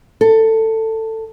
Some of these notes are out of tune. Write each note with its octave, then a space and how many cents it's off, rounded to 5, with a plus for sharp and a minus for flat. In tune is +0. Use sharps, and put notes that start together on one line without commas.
A4 +15